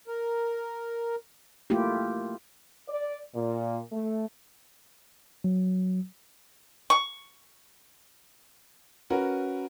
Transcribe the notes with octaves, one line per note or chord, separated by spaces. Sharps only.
A#4
A3 A#3 E4 F4 G4
D5
A#2
A3
F#3
C#6
C#4 F#4 A#4 B4